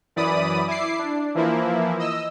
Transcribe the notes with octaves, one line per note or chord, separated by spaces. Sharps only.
F#2 E3 D5 B5 D#6 D#7
E4 D6 C7
D4
E3 F3 A#3 E4
D#5 E6